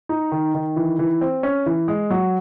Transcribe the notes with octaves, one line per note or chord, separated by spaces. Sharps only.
D#4
D#3
D#3
E3
E3
C4
C#4
E3
G#3
F#3